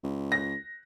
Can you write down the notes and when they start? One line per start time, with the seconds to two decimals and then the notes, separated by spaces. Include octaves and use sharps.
0.04 C#2
0.32 A#6